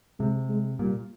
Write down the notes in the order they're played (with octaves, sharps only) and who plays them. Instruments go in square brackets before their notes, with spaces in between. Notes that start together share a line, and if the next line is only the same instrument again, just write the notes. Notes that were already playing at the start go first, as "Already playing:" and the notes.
[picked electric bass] C3 [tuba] G#3
[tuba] G#3
[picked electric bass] A#2 [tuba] G3